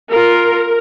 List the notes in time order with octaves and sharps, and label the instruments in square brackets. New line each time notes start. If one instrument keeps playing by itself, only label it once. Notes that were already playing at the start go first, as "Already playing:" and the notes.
[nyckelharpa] F4 [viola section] A#4